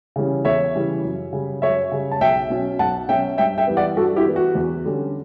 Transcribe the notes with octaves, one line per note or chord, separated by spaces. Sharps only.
C#3 E3 G3 C#4
E2 C#5 E5
C#3 E3 G3 C#4
F#2
C#3 G3
F#2 C#5 E5
C#3 G3
A5
B1 E5 G5
B2 F#3 C#4
B1 F#5 A5
B2 F#3 C#4 E5 G5
G2 E5 G5
E5 G5
E3 G3 B3
D5 F#5
G2 F#4 A4
E4 G4
E3 G3 B3
F#4
E2
D3 G3 C#4